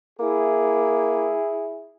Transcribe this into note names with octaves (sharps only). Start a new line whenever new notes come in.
A#3 E4 G#4